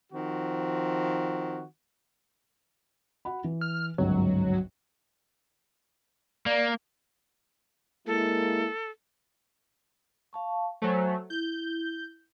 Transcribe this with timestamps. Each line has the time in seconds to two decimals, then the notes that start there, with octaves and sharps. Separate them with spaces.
0.12 D#3 F3 C4 F#4
3.25 F#4 F#5 B5
3.44 E3
3.61 F6
3.98 G1 C#2 G#2 F#3
6.46 A#3 D5
8.07 G#3 A#3 E4 A4
10.33 F5 A5 C#6
10.82 F#3 A3 C5 G#5
11.30 E4 G6